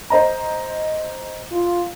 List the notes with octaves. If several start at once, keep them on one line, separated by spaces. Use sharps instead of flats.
C5 D#5 A#5
F4